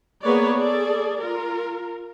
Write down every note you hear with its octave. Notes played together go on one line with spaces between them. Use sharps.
A#3 B3 G#4 B4 C#5 D5
G#4 A4 D5
F4 A#4